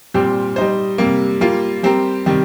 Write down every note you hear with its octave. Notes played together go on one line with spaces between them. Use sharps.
A#2 G3 C4 G4
G3 D#4 C5
C3 G3 A#3
G3 A#3 F4
G3 C4 G4 A#4
C3 D#3 G3